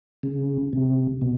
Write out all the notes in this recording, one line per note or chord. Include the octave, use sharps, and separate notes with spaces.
C#3
C3
B2